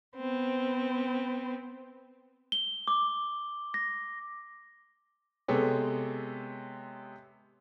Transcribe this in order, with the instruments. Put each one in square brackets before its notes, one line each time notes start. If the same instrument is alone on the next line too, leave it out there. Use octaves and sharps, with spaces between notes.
[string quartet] B3 C4
[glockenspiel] G7
D6
A#6
[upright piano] C3 G#3 B3 A4 C#5